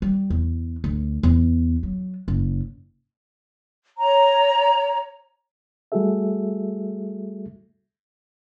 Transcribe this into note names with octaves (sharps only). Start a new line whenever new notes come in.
G3
E2
D2
E2
F#3
F#1
C#5 A#5
G3 A3 F#4 G#4 A4 E5